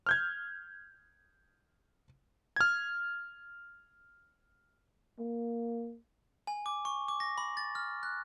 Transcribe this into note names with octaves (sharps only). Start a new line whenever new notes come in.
F6 G6 G#6
F6 G#6
A#3
G#5
D6
C#6
D6
A#6
B5
A6
F6
F#6